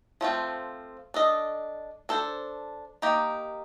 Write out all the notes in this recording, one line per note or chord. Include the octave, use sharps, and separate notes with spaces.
F3 A3 C4 F4
D4 A4 D#5
D4 A4 C5
A#3 D#4 G4